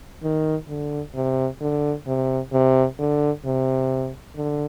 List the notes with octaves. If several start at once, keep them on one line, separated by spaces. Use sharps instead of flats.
D#3
D3
C3
D3
C3
C3
D3
C3
D3